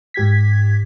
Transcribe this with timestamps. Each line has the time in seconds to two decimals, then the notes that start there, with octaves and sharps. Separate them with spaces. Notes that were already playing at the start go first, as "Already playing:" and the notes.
0.14 G#2 G4 G#6 B6